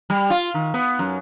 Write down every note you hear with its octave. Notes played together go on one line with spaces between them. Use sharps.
G3
F4
D#3
B3
F#2